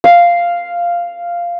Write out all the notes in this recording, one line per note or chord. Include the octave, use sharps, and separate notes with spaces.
F5